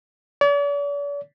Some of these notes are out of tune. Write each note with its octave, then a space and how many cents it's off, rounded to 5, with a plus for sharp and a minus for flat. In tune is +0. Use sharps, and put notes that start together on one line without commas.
D5 -45